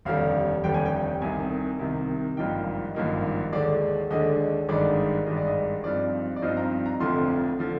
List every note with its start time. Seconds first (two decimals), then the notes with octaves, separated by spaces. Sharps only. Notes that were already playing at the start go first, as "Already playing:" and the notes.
0.05 F1 D#2 D3 G3 F5
0.63 F1 D#2 D3 G3 G5
0.74 G#5
0.86 G5
1.22 C2 C3 D#3 G#5
1.79 C2 C3 D#3
2.37 G#1 G2 F3 A#3 D#4 G5
2.95 G#1 G2 F3 A#3 D#4
3.53 D#2 D3 G#3 D4 D5
4.10 D#2 D3 G#3 D4 D#5
4.69 G#1 G2 D#3 G#3 D4 D5
5.26 G#1 G2 D#3 G#3 D4 D#5
5.37 D5
5.47 D#5
5.84 G2 F3 C4 D#4 D5
6.36 D5
6.42 G2 F3 C4 D#4 D#5
6.57 A#5
6.86 A#5
7.00 F1 F2 D3 F3 C6
7.59 D3 F3